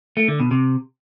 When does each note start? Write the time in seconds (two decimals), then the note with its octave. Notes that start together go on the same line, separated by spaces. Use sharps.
0.17 A3
0.28 D3
0.40 B2
0.51 C3